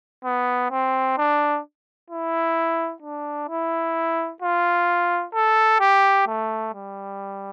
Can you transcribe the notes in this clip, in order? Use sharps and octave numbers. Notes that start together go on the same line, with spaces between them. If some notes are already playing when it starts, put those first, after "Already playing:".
B3
C4
D4
E4
D4
E4
F4
A4
G4
A3
G3